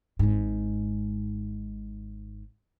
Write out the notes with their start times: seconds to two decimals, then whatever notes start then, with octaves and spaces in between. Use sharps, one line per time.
0.19 G#1 G#2